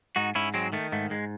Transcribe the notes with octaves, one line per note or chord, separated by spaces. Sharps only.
G#2 D#4 F#4
G#2 C#4 E4
F#3 G#3 C4
D#3 A3
G#2 A3
G#2 G#3